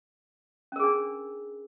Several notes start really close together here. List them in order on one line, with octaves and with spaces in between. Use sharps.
C#4 A#4 G#4 D4